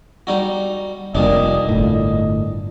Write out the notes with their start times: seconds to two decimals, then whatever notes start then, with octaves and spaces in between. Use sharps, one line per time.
0.27 G3 D#4 F#4
1.15 F1 A#2 G3 D4 D#5
1.69 G1 A2